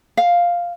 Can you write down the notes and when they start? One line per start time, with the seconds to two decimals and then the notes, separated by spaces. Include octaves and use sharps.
0.17 F5